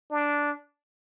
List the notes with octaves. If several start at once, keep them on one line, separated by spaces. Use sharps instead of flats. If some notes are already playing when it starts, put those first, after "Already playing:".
D4